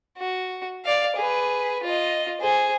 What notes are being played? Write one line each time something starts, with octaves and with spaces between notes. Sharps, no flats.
F#4
D5 F5
G#4 B4
F4 D#5
G#4 C5